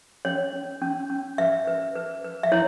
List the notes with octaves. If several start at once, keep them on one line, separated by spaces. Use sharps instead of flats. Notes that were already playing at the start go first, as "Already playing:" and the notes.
C#4 C#5
C#4
C#4
C#4
B4 E5
B4
B4
B4
E5
E4 C#5